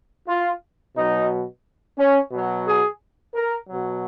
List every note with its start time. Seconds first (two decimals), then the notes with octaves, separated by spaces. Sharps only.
0.28 F4
0.96 B2 F#3 D#4
1.98 C#4
2.32 B2 F#3
2.66 G#4
3.34 A#4
3.68 B2 F#3